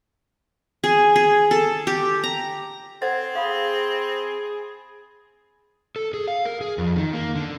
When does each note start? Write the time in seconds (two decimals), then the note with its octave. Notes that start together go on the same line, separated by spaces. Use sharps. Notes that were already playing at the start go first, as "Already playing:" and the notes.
0.84 G#4
1.16 G#4
1.51 A4
1.87 G4
2.24 A#5
3.02 C4 A4 C5 F#5 G#6 A6
3.35 G#4 F5 B5 A6
5.96 A4
6.14 G#4
6.28 F5
6.45 A#4
6.61 G#4
6.78 F2
6.96 D#3
7.13 A#3
7.35 D3